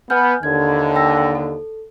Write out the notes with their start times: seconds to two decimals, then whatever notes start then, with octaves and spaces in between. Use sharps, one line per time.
0.10 B3 G#5 F6 G6
0.43 D#2 D3 G#6
0.95 G5 E6 A#6
1.35 A4